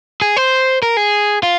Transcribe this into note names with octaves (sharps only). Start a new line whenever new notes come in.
G#4
C5
A#4
G#4
F4